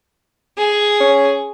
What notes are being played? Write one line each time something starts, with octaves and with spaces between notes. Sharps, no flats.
G#4
C#4